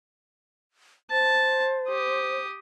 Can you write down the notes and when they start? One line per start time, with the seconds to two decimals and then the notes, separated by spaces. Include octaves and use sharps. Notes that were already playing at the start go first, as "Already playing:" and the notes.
1.11 C5 A5
1.89 G4 D#6